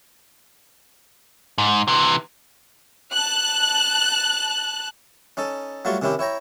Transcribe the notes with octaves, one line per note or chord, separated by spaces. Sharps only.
G#2
C3 E3
A5 F#6
C#4 D#4 A4
F#3 G3 A3 F4 C#6
C3 D#3 C#4 E4 G4
E4 C#5 G5 A#5